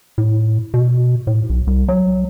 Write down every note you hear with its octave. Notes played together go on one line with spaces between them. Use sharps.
A2
B2
A2
B1
C2
F#3